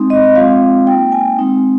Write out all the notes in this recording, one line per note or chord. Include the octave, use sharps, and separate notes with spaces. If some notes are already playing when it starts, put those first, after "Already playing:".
Already playing: G#3 C4 D#4
D#5
G#3 C4 F4 F5
A#3 D#4 G5
G#5
G#3 C4 D#4